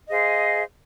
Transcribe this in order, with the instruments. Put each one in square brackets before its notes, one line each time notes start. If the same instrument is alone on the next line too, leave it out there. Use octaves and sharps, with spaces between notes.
[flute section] G#4 C5 D#5 F5